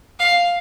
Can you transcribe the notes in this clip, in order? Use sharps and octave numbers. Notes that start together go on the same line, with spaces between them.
F5